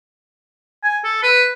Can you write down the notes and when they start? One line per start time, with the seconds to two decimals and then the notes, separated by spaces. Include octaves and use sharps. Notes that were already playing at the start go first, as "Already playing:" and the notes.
0.84 G#5
1.04 A4
1.23 B4